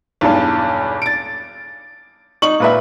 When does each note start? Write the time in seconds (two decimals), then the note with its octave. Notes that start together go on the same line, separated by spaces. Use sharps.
0.21 B1 E2 G2
1.02 A6 D7
2.42 D#4 C#6 F#7
2.60 A#2 B4 E5